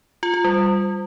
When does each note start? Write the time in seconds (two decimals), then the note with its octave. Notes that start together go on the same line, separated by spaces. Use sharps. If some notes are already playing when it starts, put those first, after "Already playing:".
0.23 F4
0.34 F4
0.44 G3